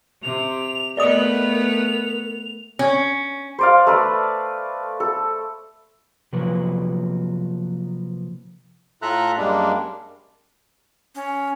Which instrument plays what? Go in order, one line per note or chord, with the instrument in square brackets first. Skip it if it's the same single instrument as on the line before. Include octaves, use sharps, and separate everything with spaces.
[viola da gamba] C3 [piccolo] F7
[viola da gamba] A3 B3 [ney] A#4 [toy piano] D5 D#5 D#6 [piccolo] F7
[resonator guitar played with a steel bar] C#4
[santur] C5 D5 F5
A3 B4 D5
A4
[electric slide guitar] C3 F3 F#3 A#3 B4
[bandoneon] A2 F4 A4 E5 A#5 F#6
F#2 G3 G#3 A#3 D4
[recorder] C#4